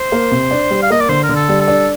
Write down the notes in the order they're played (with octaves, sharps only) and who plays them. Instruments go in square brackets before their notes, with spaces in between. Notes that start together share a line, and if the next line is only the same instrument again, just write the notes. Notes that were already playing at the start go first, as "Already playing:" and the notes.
Already playing: [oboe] C5
[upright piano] A#3
C3
D4
G3
[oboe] F5
[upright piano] A#3 [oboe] D#5
[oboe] D5
[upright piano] D3 [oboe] C5
[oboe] A#4
[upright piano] D3
[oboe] A4
[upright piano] G3
[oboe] A4
[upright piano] D4